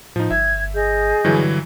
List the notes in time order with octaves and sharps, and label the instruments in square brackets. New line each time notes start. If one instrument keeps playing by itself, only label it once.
[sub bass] A2 [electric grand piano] F3 D#4
[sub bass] G1 [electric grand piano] E5 [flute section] G#6
[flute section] G#4 D#5 G6
[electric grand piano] G2 E3 F#3 [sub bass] D3